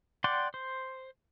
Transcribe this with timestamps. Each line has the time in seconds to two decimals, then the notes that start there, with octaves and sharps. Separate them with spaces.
0.24 D5 F#5 G5 C6 D6
0.54 C5